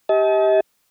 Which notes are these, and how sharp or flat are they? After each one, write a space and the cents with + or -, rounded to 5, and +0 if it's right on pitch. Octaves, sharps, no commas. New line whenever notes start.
G4 +0 D#5 +40 A5 -35